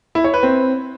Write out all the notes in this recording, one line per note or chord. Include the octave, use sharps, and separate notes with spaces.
E4
C#5
B4
C4